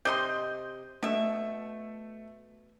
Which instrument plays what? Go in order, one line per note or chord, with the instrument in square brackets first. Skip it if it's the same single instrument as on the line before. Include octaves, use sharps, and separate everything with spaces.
[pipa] C3 D#5 C6 [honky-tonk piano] G6
[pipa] B2 E5 [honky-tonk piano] A3